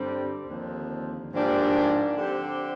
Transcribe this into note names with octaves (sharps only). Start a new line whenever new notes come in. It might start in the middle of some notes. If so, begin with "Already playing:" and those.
Already playing: G2 D3 G3 C4
D#2 D3 F3 C4
G#2 F3 A#3 D4 G4
D3 F3 C4 G4 C5